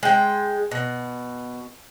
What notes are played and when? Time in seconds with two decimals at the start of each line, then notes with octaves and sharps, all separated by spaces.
0.03 G#3 G5
0.71 B2